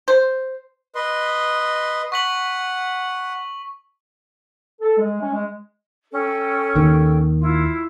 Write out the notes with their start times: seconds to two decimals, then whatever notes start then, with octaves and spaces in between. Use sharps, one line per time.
0.08 C5
0.95 B4 D#5 C6
2.12 F#5 C#6 B6 F#7
4.81 A4
4.98 G#3
5.21 C#4
5.33 G#3
6.11 C#4 A4 G5
6.75 D#2 D#3
7.39 E4 F4